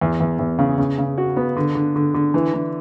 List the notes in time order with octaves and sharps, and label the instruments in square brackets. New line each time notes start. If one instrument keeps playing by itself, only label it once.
[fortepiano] E2
E2
E2
C#3
C#3
C#3
F#4
B3
D3
D3
D3
D3
E3
E3